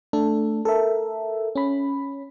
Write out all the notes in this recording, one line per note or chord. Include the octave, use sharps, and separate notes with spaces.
A3 D4 A4
A4 A#4 E5
C#4 B5